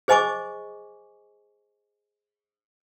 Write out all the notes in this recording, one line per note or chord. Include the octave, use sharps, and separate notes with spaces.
G#4 C5 D#5 G#5 C#6 D6